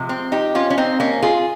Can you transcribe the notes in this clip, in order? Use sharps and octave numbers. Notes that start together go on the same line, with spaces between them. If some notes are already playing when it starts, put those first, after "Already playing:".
Already playing: C3 F3 G#3
C4
D#4 G4
C#4 F4
C#4
C4 D#4
A#3 C#4
F4 G#4